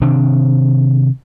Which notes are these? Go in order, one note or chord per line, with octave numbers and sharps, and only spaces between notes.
C3 D#3 C4 D4